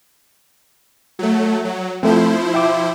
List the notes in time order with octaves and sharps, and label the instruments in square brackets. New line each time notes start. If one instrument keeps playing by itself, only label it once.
[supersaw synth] F#3 A3
F#3
[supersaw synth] F3 E4 C5 [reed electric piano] A3 C4
[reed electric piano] E5 G5 D6